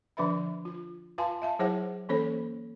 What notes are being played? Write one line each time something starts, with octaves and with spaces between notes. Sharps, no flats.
D3 F3 D4 B4 E5 B5
F4
F4 B4 F5 G#5 A5 C6
E5 F5 A5
F#3 E4 G#4 C5 C#5 F#5
E3 A#3 C#4 A4 C5 C#5